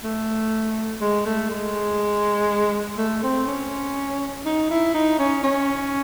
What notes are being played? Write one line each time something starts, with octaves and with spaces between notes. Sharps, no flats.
A3
G#3
A3
G#3
A3
C4
C#4
D#4
E4
D#4
C#4
C#4